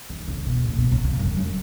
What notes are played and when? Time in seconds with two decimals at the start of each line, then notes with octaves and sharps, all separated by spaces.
0.10 D#3
0.28 C#3
0.46 B2
0.64 A#2
0.78 B2
0.92 C#3
1.05 C#3
1.19 F#2
1.37 F#2